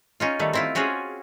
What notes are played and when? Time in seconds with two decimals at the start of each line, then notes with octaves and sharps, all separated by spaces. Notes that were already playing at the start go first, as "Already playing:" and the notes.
0.20 C#4 D#4 F4
0.39 D#3 G3 A3
0.53 C4 E4 F4
0.75 C4 C#4 F4 F#4 G#4